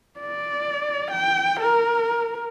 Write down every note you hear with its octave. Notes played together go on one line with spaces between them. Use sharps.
D5
G5
A#4